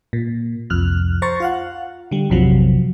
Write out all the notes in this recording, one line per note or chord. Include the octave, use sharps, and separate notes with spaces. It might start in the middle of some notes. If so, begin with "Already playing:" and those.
A#2
C2 F2 F6 F#6
C5 A#5 C#6 A6
F4 F5 F#5
D3 G3
A#1 F2 C3 F3 F#3